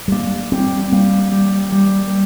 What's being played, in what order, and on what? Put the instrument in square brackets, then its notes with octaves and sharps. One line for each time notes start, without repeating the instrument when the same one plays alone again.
[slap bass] G3
[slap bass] A#3 [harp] D4
[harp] G3 [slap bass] C4
[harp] G3 [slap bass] A#3
[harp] G3
G3